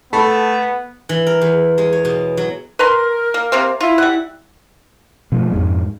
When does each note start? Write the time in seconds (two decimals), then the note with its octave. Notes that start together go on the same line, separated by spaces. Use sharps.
0.13 A3 B3 A4 A5 B5
1.09 E3
1.26 A#4
1.41 E2
1.78 G#3
1.93 C#5
2.05 B2
2.37 F#3
2.79 A#4 B4 A#5 C6
3.34 A#3
3.52 C3 A#3 C4
3.81 E4 F4
3.98 G3 F#5
5.32 B2 F3 A3
5.52 F2 G#2 G#3